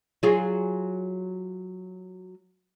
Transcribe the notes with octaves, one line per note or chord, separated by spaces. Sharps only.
F#3 F4 G#4